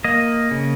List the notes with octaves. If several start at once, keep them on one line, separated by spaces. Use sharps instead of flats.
A#3 D#5
C#3